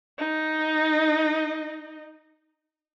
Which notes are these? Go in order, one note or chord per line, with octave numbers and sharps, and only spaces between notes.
D#4 D#5